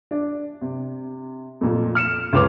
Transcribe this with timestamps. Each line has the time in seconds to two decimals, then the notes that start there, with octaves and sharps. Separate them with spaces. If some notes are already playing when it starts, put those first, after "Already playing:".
0.11 D4
0.61 C3
1.61 F2 A#2
1.95 F6 C#7 E7
2.33 C#2 C#4 B4 D6 F7